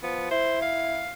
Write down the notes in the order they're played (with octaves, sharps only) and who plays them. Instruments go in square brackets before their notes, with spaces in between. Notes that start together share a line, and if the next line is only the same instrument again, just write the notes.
[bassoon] F3 [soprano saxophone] B3
[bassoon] E4 [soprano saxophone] C5
[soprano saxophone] F5